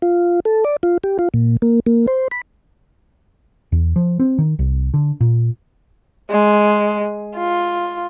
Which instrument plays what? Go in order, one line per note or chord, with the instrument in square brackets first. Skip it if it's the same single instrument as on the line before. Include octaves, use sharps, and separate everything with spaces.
[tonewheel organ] F4
A4
D5
F4
G4
F4
A#2
A#3
A#3
C5
B5
[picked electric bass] E2
F3
C4
D#3
C2
D3
A#2
[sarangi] G#3
F4